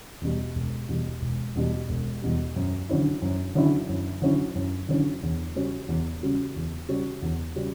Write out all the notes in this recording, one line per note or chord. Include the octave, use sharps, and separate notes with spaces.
E2 B2 G3
E1
E2 B2 G3
E1
E2 B2 G3
E1
E2 B2 G3
F#2
D3 F#3 C#4 E4
F#2
D3 F#3 C#4 E4
F#2
D3 F#3 C#4 E4
F#2
D3 F#3 C#4 E4
E2
C#3 G3 C#4 F#4
E2
C#3 G3 C#4 F#4
E2
C#3 G3 C#4 F#4
E2
C#3 G3 C#4 F#4